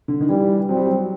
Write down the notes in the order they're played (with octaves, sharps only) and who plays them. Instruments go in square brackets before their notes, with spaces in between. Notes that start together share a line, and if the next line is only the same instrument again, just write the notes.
[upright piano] D3
D#3
[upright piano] E3 [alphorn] G3
[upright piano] F#3 [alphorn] C4
[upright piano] G3
F#3